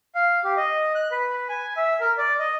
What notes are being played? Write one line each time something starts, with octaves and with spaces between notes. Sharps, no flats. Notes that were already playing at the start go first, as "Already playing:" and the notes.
F5
G4
D#5
F#6
B4
G#5
E5
A#4
D5
D#5